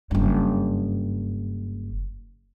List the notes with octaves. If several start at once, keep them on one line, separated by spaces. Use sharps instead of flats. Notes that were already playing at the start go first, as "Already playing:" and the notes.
F#1 G2